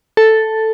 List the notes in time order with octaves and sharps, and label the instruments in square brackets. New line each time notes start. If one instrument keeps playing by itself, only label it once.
[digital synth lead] A4